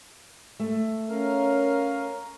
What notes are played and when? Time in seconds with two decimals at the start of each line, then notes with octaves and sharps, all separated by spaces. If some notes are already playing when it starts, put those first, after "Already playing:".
0.60 A3
1.09 C#4 A#4 F5